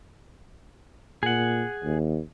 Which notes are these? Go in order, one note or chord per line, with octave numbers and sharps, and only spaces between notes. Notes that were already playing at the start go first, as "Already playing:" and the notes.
A#2 G#4 F#5
D#2